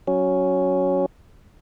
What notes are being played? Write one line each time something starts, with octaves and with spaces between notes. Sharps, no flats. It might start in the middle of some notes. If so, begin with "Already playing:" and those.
F#3 C#4